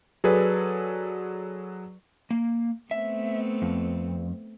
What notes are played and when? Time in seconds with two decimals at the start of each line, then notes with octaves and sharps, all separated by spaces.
0.24 F#3 G#4 A4 B4 D5
2.31 A#3
2.91 A3 B3 C4 E5
3.62 F2